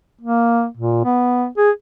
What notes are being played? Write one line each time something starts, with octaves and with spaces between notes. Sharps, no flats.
A#3
A#2
B3
G#4